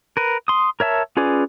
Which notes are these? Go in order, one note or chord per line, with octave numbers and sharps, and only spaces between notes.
A#4 B4
C6 D#6
A#4 C#5 E5 A5
C#4 F4 G#4 B4 D5